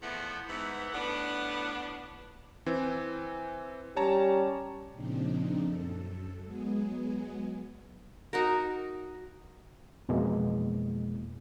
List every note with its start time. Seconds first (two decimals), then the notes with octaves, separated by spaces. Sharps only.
0.01 E2 F3 A3 B3
0.47 G#2 E3 B3
0.92 A2 B3 D4 F#5
2.66 E3 C4
3.97 G3 C#4 G4 C#5 A5 A#5
4.93 A#2 C#3 F3 C4 D4 D#4
5.62 F#2 A4
6.43 F#3 G#3 B3 G#4
8.33 D#4 F#4 A#4
10.09 F2 B2 E3 G#3 A#3